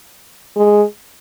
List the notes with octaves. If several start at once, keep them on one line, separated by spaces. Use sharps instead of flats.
G#3